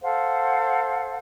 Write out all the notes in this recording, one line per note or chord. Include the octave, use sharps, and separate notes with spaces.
A4 C5 F5 F#5